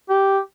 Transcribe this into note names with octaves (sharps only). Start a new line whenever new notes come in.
G4